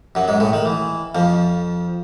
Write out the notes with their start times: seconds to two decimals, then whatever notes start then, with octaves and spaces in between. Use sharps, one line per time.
0.15 F#2 F#3
0.28 G#2 G#3
0.40 A2 A3
0.53 D#3
0.65 E3
1.15 F2 F3